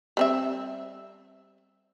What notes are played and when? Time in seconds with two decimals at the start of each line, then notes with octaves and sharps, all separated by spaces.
0.17 G3 C4 E5